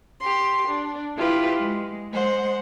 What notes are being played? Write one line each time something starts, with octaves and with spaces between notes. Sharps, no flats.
G4 C6
D4
E4 F4 G4 B4
G#3
G#3 C5 F#5